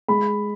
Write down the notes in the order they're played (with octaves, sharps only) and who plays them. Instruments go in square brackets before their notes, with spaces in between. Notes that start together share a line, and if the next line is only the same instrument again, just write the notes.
[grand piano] G#3 B5